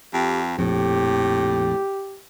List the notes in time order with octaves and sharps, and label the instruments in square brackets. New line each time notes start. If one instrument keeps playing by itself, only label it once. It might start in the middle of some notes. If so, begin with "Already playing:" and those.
[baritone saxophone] F2 [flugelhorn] G4
[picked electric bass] A#1 F2 [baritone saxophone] A2 [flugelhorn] G4